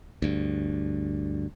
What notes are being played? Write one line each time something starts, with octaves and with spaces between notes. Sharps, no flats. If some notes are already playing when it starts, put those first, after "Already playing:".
D2 G2